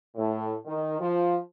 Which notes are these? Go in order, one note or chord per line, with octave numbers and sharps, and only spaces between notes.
A2
D#3
F3